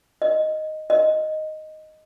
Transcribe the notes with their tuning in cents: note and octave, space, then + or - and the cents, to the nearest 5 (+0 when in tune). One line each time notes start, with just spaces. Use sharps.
D#5 +0
D#5 +0